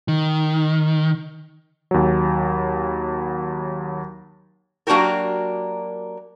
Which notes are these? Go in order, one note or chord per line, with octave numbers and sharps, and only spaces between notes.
D#3
D#2 F#3
F#3 A#3 D4 F#4 G4 A#4